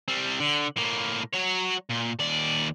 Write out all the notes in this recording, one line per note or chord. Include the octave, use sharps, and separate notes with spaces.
G3 C4
D3
A2 A#3
F#3 C#5
A#2
D#2 D5